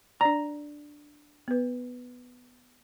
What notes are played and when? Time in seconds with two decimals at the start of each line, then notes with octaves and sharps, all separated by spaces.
0.21 D4 D5 A#5
1.48 B3 B4